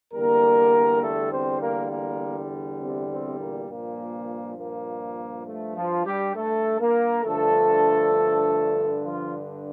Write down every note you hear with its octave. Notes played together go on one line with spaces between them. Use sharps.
E2 D3 G3 A#3 A#4
A3 A4
C4 C5
A#3 A#4
A#3 A#4
C3 C4
C3 C4
A#2 A#3
G2 A#2 F3 A#3
A#2 A#3
A3
F3 F4
G3 G4
A3 A4
A#3 A#4
G2 D3 F3 A3 A4
F3 F4